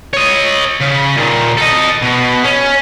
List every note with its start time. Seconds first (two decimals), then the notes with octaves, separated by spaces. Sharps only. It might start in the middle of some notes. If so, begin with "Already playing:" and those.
0.13 C#5 D#5
0.81 C#3
1.17 A#2 D#3
1.57 A4 D#5
2.02 B2
2.45 C#4